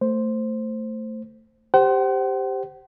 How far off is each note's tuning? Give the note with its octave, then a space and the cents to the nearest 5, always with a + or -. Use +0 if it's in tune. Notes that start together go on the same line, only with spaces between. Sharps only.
A3 +20 C5 +0
G4 +0 C5 +0 F#5 +45